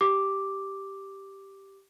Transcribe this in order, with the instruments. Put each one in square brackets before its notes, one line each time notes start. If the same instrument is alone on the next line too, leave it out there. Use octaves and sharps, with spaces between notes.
[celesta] G4 D6